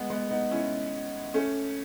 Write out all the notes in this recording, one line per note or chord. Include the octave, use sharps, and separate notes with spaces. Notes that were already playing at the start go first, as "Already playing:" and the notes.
Already playing: G#3 B3
G#3 B3
B3 D#4
C#4 E4
A3 C#4